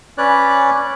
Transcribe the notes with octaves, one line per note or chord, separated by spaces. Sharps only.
C#4 B4 C#5 D5 F#6